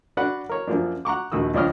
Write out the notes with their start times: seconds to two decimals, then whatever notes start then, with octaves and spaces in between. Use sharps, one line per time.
0.17 D4 F#4 B4 F#5
0.49 A#4 C#5
0.67 F#2 F3 A#3 D4
1.05 F#5 A#5 C#6 D6
1.32 A#1 D#2 F#4 D#6 E6
1.54 C#2 F3 D4 C#5 D#5 F6